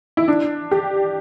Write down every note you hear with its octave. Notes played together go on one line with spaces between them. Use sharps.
E4
D4
G4